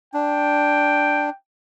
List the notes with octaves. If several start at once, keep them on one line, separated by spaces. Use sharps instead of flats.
D4 G5